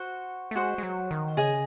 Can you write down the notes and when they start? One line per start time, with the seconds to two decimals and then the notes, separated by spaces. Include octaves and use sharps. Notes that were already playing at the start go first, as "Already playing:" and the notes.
Already playing: F#4 C5 F#5
0.51 A3
0.55 G#3 F#4 C5 F#5
0.78 G#3
0.83 F#3
1.11 D#3
1.37 C#3 G#4 D#5 G#5 D#6